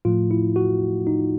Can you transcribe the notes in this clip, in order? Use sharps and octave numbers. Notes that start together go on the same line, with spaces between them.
A2 F3 A3 F4
E4
F#4
D#4